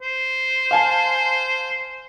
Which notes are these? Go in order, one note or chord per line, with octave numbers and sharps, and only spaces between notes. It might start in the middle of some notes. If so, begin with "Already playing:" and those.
C5
F5 G#5 A5